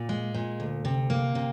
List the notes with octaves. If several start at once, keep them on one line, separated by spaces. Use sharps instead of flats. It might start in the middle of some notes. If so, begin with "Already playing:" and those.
Already playing: A#2
G#3
A#2
D2
C3
A#3
C3